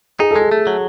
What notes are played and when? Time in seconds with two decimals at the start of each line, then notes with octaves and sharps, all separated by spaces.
0.20 D#4 G#4
0.31 G#3 A4
0.41 G#4
0.52 A3
0.67 F#3